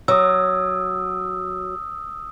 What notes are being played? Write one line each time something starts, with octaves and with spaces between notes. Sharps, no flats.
F#3 D#6 E6